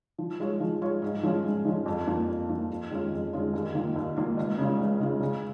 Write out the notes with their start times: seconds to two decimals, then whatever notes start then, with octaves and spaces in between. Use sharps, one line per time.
0.18 F3
0.40 G#3 F4 C#5
0.60 F3
0.82 G#3 F4 C#5
1.02 G#2
1.23 F3 G#3 C#4 F4
1.44 G#2
1.65 F3 G#3 C#4 F4
1.86 F2
2.07 F3 A#3
2.28 F2
2.49 F3 A#3
2.70 F2
2.91 D#3 G#3 C#4 F4
3.12 F2
3.33 D#3 G#3 C#4 F4
3.53 D#2
3.74 D#3 A#3 F4
3.96 D#2
4.16 D#3 A#3 F4
4.37 C#2
4.59 C#3 G#3 C#4 F4
4.79 C#2
5.00 C#3 G#3 C#4 F4
5.20 C#3